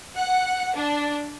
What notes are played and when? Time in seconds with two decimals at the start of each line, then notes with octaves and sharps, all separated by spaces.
0.16 F#5
0.74 D4